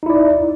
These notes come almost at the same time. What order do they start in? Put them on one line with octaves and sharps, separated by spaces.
D#4 E4 D5